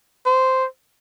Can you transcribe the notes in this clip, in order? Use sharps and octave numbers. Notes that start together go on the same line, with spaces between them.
C5